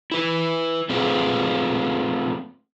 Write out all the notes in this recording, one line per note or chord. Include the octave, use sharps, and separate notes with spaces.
E4 B4
A3 C4 F4 G#4 B4